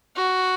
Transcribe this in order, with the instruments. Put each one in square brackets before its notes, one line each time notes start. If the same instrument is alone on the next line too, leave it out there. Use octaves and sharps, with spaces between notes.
[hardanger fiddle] F#4